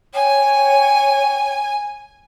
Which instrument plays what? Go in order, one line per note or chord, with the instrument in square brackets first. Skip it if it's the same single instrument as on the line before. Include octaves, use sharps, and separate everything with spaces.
[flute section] C#5 G5 [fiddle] G#5